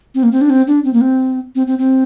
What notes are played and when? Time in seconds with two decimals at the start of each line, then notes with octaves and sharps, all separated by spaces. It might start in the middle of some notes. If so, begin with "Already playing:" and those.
0.15 C4
0.23 A#3
0.32 C4
0.41 D4
0.50 C4
0.67 D4
0.84 C4
0.93 A#3
1.01 C4
1.55 C4
1.67 C4
1.79 C4